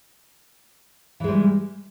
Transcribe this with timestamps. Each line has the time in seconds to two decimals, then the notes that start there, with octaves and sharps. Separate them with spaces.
1.20 E3
1.24 G#3
1.28 G3